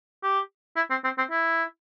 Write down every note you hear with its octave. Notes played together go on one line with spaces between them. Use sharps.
G4
E4
C4
C4
C4
E4